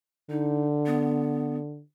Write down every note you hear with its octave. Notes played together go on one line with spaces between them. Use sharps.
D3 D#4
B3